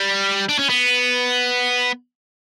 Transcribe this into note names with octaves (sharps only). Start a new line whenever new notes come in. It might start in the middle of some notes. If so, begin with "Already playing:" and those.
Already playing: G3
D4
C#4
B3